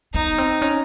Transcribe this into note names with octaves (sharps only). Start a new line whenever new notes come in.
B3 D#4
C4
C#4